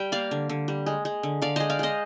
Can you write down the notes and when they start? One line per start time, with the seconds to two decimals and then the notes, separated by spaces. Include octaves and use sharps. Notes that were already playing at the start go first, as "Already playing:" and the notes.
Already playing: G3 G5
0.12 A#3 D5 F5
0.31 D3
0.49 D3
0.68 G3
0.86 G#3
1.05 G#3
1.23 D3
1.42 D3 D5 F5
1.56 G#3 C5 D#5
1.70 D5 F5
1.79 G#3 C5 D#5